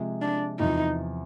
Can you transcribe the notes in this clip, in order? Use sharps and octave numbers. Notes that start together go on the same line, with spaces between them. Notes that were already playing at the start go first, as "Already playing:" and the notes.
Already playing: C3 F3 G#3
D4
E2 C3 F3 D#4